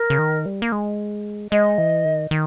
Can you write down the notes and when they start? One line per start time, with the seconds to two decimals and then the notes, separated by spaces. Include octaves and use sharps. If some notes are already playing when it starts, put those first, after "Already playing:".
Already playing: A#4
0.10 C#3
0.19 D#3
0.46 G3
0.62 A#3
0.72 G#3
1.52 G#3 D#5
1.78 E3
2.05 D#3
2.31 D#3